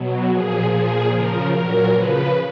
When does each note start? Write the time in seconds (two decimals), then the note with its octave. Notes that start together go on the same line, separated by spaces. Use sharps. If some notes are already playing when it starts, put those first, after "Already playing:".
Already playing: B2 F#3
0.29 A#2 F3 G#4
0.68 A#2 F3 G#4
1.09 C#3 F3 A#4
1.50 A#2 F#3 A#4
1.90 C#3 F3 B4